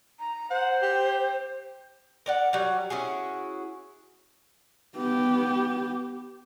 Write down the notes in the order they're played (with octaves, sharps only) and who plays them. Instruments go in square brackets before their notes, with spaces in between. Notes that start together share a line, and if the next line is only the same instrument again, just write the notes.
[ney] A#5
[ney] C5 [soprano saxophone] F#5
[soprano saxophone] G4
[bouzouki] A#4 D5 F#5
F#3 G3
C#4 E4 F#4 G#4
[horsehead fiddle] B3 G4